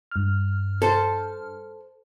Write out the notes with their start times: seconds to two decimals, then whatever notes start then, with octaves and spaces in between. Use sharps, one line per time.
0.11 G2 F6
0.82 A4 C5